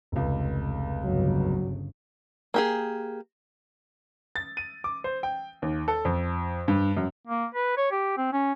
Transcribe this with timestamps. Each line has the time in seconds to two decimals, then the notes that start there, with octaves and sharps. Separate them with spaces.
0.12 F1 C#2
1.04 G1 C#3 F#3
2.54 A#3 G4 G#4
4.36 A6
4.57 D#7
4.84 D6
5.04 C5
5.23 G5
5.62 D#2
5.88 A4
6.05 F2
6.68 G2
6.97 F#2
7.27 A#3
7.55 B4
7.77 C#5
7.92 G4
8.17 C4
8.33 C#4